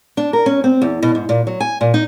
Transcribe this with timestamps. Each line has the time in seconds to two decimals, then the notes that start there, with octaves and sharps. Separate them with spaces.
0.17 D4
0.33 A#4
0.46 C#4
0.64 C4
0.82 E2
1.03 B2
1.15 G#2
1.29 A#2
1.47 F#3
1.60 G#5
1.81 A#2
1.94 D#4